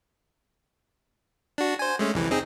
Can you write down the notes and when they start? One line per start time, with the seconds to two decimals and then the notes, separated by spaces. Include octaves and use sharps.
1.58 D4 F#4
1.79 C5 G#5
1.99 G#3 A3 C#4
2.14 C2 F2 E3
2.31 C4 D#4 G#4